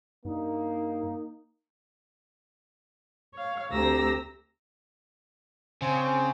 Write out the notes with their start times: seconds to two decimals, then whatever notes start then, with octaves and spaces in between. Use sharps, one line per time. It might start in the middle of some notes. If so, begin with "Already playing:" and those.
0.25 G2 A#3 D#4
3.34 C#5 F5
3.72 D2 C4 G4 A#5 E6 A#6
5.82 C#3 C4